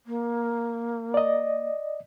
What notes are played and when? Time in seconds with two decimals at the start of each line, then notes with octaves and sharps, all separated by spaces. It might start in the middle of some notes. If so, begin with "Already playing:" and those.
0.06 A#3
1.14 D5 D#5